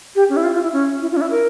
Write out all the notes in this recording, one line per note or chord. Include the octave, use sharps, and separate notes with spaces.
G4
C#4
E4
F4
F4
E4
C#4
E4
F4
C#4
E4
A#4